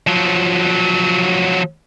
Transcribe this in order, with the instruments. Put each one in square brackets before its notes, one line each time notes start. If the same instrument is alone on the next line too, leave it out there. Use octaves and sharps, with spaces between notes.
[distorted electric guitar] F3 F#3